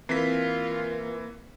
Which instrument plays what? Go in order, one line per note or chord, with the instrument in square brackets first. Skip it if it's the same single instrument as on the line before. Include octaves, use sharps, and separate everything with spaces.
[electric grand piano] E3 B6 [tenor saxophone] A#3 [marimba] C4 [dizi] F4